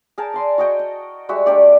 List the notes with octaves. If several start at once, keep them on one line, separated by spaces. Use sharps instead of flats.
G#4 A#4 G5 A5
D5 C6 D#6
F#4 D#5 G5 C#6
D#5
G3 G#3 F#4 E5
A3 D4 G4 D5